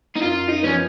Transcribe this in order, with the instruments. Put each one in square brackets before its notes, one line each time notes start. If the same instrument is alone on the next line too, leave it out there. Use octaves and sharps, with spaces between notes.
[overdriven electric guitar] D#4
[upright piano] F#2 [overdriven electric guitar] F4
[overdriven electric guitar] D#4
[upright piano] F3 B3 [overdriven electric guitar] C#4